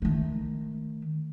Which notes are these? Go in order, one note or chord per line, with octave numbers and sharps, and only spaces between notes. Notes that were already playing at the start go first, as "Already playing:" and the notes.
D#3 A3